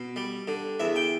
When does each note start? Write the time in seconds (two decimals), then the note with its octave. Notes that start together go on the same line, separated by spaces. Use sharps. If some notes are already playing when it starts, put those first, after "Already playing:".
Already playing: B2
0.16 G3
0.48 D3
0.80 E2 E5
0.96 G5